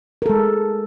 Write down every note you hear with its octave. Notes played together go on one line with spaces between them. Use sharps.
G#3 A4 A#4